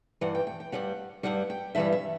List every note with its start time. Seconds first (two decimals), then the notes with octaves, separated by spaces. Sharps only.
0.21 G2 E3 G3 F#5
0.35 G5
0.47 G5
0.60 G5
0.72 G2 E3 G3 F#5
1.23 G2 E3 G3 F#5
1.50 G5
1.75 G2 E3 G3 E5
1.92 E5